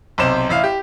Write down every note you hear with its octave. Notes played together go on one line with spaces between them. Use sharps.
B1 C3 C5 E7
A1 E5 F5
G4